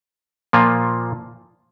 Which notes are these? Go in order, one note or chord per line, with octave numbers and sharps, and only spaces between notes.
A#2 F3 A#3 F4